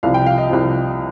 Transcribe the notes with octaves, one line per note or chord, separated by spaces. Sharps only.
C2 C3 F3 F5
G5
F5
D#5
C2 C3 F3